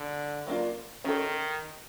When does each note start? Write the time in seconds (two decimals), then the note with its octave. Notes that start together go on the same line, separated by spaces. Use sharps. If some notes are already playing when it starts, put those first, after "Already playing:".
Already playing: D3
0.47 F#3 A#3 D4 F4
1.04 D#3 C#4 F#4 A4